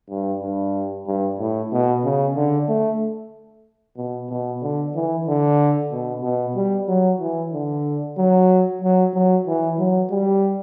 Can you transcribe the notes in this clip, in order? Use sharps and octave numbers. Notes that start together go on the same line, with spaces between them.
G2
G2
G2
A2
B2
C#3
D3
A3
B2
B2
D3
E3
D3
B2
B2
G3
F#3
E3
D3
F#3
F#3
F#3
E3
F#3
G3